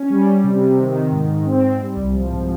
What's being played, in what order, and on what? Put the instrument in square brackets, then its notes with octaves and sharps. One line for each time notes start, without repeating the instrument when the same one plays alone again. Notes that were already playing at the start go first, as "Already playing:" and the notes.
Already playing: [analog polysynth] C#4
G3
G3
C3
C3
D#3
D#3
G#2
G#2
C4
C4
G3
C2
F3
G#2